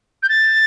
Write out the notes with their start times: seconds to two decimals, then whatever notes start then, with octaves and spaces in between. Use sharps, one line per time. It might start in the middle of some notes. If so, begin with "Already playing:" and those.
0.23 G6
0.29 A6